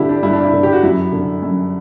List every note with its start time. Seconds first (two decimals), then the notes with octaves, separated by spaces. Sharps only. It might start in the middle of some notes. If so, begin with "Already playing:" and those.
Already playing: G2 D3 E4 G4
0.09 D4
0.23 G2 E4
0.33 D4
0.43 E4
0.53 D3
0.63 G4
0.73 F#4
0.83 F#2 E4
1.12 D3
1.42 F#2